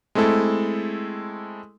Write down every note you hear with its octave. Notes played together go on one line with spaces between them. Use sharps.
G#3 A3 C4 E4 A4